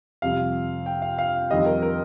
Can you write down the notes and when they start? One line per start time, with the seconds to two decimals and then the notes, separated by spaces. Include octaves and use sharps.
0.22 F2 C3 G3 F5
0.86 G5
1.02 F5
1.18 F5
1.50 F2 D#3 G3 D#5
1.66 A#4
1.82 A#4